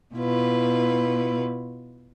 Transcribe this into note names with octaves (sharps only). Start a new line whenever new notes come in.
B2 E4 F4 B4